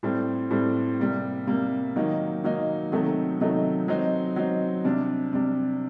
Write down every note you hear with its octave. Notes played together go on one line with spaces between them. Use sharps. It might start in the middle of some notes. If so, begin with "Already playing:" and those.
A2 G3 C4
A2 G3 C4
C3 G3 A#3
C3 G3 A#3
D#3 F#3 A#3 D#4
D#3 F#3 A#3 D#4
C3 D#3 F#3 A3 D#4
C3 D#3 F#3 A3 D#4
F#3 C4 D#4
F#3 C4 D#4
C3 G3 D4
C3 G3 D4